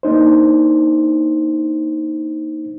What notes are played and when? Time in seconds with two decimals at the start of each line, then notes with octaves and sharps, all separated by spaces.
0.03 A#3 D4 D#4 C5